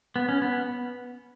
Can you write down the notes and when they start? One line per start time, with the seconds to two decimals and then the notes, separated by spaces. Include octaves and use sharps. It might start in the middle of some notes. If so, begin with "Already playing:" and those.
0.16 B3
0.29 C#4
0.42 B3